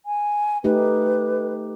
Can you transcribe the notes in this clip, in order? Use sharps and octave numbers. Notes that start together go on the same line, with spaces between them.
G#5
A3 D#4 G4 B4